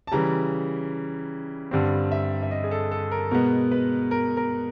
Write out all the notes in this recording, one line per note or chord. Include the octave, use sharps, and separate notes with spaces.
A5
C#3 E3 G3 A#5
G2 D3 G3 C4
E5
E5
D#5
G#4
A4
A4
A#4
B2 G#3 B3 A#4
B4
A#4
A#4